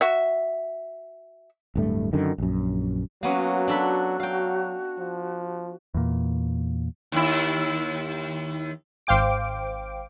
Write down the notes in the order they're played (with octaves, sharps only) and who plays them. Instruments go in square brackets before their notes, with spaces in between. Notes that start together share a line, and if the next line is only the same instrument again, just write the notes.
[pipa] F#4 E5
[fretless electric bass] D1 G2 A3
F#2 D3 D#3
A#1 F#2
[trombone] F#3 [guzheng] A#3 B3 C#4 [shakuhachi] F#4
[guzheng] D4 A4 B5
[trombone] F#3 [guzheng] F5 G5
[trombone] F3
[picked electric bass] E2 A#2
[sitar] D#2 E4
[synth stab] G#1 C5 F5 G5 D6 D7